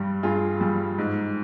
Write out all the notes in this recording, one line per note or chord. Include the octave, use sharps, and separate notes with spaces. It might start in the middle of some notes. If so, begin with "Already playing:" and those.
Already playing: G2 G3
G2 F4 G#4
G3
G#2